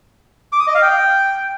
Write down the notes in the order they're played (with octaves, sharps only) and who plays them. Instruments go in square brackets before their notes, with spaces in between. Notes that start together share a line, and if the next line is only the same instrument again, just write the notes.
[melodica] D6
D#6
D#5
F5
G5